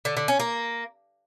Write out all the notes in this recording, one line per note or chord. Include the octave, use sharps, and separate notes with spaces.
D3
D3
C#4
A#3